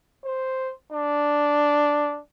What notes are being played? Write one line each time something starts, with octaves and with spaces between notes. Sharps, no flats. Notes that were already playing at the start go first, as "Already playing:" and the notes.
C5
D4